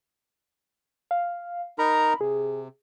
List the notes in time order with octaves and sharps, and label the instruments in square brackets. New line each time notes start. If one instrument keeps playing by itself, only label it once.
[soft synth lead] F5
[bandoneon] D#4 A#4 A#5 [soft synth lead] B5
[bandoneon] C3 [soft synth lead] G#4